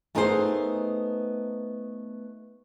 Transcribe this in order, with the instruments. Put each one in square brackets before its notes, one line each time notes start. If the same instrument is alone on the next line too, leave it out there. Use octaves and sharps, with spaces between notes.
[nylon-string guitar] A3 B3 D#4 G#4 A#4 C5